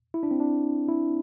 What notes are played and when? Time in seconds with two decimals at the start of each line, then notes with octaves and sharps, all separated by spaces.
0.14 E4
0.23 D4
0.31 C4
0.40 D4
0.88 E4